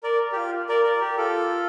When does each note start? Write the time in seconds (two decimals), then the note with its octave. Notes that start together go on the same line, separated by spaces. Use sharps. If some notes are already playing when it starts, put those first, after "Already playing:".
0.03 A#4 D5
0.32 G4
0.36 F4
0.69 A#4 D5
0.84 A#4 D5
1.01 G4
1.17 F4 A4